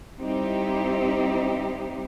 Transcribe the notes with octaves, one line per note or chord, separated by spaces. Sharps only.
G3 C4 D#4 E4 G4